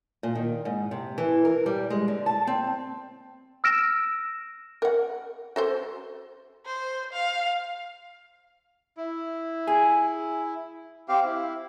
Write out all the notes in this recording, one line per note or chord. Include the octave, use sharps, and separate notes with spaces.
A#2
D#3
G#2
C3
E3
A#4
G3
G#3
D3
A5
C4
E6 F6 A#6 D7 E7
A#4 F#5
F#4 A4 C5
C5
F5
E4
G#4
C4 G4 F5
E4